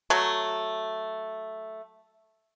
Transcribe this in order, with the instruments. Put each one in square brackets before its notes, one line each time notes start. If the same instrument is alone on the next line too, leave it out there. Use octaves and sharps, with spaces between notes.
[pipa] F#3 A3